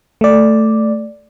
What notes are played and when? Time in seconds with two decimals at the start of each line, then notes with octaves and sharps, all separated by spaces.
0.21 A3 D5